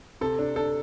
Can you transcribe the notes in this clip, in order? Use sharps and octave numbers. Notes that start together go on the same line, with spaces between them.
C3 A4
D4
D4 A4